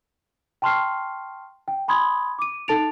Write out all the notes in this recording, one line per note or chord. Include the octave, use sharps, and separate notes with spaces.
G5 A5 C6 C#6 F6 C7
G5
G#5 B5 C6 D#6 G#6
D6 D#7
D#4 A4 A5 A6 D7 F7